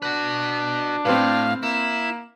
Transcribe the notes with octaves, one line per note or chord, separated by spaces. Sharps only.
D4 F#4 B4
A2 C4 B4 F5
A#3 E4 E7